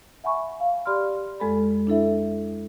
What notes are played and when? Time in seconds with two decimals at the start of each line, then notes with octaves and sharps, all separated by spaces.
0.24 E5 F#5 G#5 B5 C#6
0.60 F5
0.86 G4 D5 B5 C6 F6
1.40 F2 G#3 A4 B5
1.87 D4 E4 A4 E5